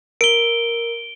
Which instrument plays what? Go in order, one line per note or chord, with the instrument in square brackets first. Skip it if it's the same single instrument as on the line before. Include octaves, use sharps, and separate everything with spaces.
[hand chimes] A#4 [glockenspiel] D7 G7